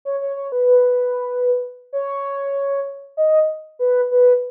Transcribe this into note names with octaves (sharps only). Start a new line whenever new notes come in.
C#5
C#5
C#5
B4
C#5
D#5
B4
B4